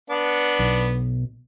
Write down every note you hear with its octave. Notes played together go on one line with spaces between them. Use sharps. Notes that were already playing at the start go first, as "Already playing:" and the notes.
B3 D4 F#5
B1